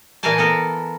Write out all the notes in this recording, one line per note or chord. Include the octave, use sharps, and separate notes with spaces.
A#2 E3 A#4 F5 G#5 A5
B3 A4 A#4